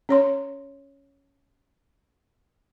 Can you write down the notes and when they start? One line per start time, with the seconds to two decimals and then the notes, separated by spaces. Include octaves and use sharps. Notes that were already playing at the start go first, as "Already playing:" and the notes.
0.09 C#4 C#5 C6